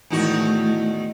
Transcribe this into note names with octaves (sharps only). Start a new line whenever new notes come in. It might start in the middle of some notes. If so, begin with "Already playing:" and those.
E2 A2 D#3 A3 F#4